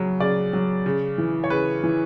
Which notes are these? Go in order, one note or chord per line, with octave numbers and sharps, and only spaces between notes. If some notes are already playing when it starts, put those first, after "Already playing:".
Already playing: C#3 F#3
C#3 D5
F#3
C#3
E3
C#5
C#3 B4
E3